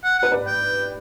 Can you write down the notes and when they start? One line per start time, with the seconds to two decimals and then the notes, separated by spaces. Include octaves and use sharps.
0.04 F#5
0.18 G4 B4 F#5
0.32 B4 D5
0.47 G5